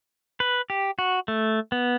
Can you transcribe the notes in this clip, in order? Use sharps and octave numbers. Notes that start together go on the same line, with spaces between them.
B4
G4
F#4
A3
B3